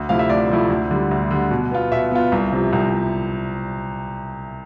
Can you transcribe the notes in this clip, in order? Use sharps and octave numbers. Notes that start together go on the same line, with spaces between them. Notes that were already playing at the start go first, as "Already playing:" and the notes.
Already playing: D2
C3 F3 A3 E4 F5
E5
D2 D5
C3 F3 A3 E4
D2
D3 G3
D2
D3 G3
B2
B3 F4
B2 E5
B3 F4
C2
C3 F3
C2